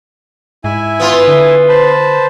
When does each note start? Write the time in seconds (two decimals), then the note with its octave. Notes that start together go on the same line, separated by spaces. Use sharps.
0.64 G#2 E4 E5 G#5
1.00 B3 F4
1.28 D3
1.68 B4 C5 A5